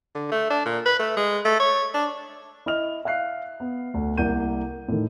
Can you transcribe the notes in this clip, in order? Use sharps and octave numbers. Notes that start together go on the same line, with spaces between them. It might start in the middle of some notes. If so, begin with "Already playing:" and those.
D3
A3
D4
A#2
B4
A3
G#3
A3
C#5
D4
E4 D#5 F6 F7
E5 F5 F#6 C7
B3
D2
C2 A#3 F#5 G6 D#7
A2 D#3